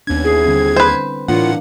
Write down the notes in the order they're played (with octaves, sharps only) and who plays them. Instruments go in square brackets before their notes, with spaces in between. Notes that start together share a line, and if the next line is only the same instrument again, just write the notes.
[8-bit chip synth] D#2 G#6 [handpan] B3 C#4 D4
[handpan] E4 [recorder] G#4
[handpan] D3 G3 C4
[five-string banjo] B4 C5
[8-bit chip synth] A2 F#5 [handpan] E3 A#3 D4 [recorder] F4